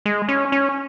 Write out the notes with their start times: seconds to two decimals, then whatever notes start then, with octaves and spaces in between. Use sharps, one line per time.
0.06 G#3
0.29 C#4
0.52 C#4